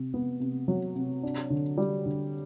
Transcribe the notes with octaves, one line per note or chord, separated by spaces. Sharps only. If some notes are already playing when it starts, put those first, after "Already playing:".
Already playing: C3
B3
C3
F#3
C3
D4
D3
G3
D3